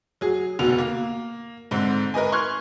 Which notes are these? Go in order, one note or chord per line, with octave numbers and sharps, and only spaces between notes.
F#3 G#4
F1 B2 D3 F7
A#3
G#2 D3 C4
A#4 B4 D#5 G#5
C6 C#6 F6 F#6 G#6